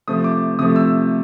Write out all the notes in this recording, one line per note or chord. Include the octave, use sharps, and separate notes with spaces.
C3 F3 A3 D#6
D6
C3 F3 A3 D#6
E6